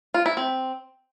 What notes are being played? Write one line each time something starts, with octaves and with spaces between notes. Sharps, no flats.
F4
E4
C4